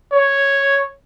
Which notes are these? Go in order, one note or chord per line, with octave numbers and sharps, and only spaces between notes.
C#5